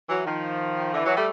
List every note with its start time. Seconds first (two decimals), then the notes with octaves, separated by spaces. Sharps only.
0.09 E3 F#3
0.26 D#3 F3
0.94 D3 E3
1.05 E3 F#3
1.17 G3 A3